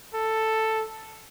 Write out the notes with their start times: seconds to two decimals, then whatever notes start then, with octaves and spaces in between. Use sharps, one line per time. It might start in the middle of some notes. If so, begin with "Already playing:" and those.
0.14 A4